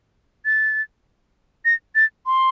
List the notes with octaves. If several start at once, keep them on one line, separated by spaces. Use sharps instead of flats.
A6
A#6
A6
C6